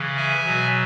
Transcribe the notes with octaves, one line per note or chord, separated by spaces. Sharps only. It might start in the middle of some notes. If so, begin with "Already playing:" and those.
Already playing: C#3 E3
E5 G#5
B2 F#3